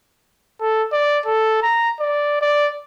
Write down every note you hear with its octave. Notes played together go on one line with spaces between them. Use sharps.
A4
D5
A4
A#5
D5
D5